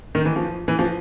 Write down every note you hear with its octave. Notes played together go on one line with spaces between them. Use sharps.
D#3
E3
F3
E3
F3